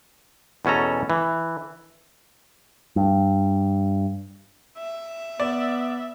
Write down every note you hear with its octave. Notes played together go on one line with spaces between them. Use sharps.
E2 B2 C#4 A4 A#5
E3
G2
E5
B3 D5